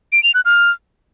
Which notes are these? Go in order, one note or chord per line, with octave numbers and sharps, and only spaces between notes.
D7
F7
F#6
F6